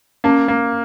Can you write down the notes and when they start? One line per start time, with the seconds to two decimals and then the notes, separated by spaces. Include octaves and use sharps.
0.24 A#3 C#4
0.48 A#3